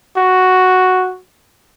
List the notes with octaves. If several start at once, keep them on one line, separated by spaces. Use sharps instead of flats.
F#4